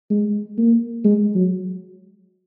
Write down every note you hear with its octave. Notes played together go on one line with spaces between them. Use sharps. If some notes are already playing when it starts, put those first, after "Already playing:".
G#3
A#3
G#3
F#3